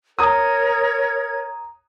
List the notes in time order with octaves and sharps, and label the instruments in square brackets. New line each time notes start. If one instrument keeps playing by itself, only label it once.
[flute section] A#4 C#5 G#6 [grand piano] A#5 D#6